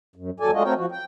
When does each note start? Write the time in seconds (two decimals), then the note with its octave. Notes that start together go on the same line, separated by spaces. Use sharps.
0.16 F#2
0.40 D#2 F#3 A4 D5 G#5
0.53 G#3 A3 D4 F4 F#4 D#5
0.64 A3 C4 F#4 A#4 C#5 G5
0.76 F3 F#4
0.92 G5